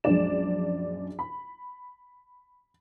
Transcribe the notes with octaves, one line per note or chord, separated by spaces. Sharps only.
A#1 F#2 G#3 D4 D5 E7
B5